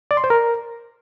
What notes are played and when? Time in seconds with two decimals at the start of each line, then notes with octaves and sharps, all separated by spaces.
0.11 D5
0.17 C6
0.24 C5
0.30 A#4